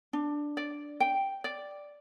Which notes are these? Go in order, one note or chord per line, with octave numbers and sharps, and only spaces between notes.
D4
D5
G5
D5